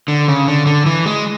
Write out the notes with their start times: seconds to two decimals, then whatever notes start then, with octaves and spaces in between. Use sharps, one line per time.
0.08 D3
0.28 C#3
0.48 D3
0.66 D3
0.86 E3
1.06 G#3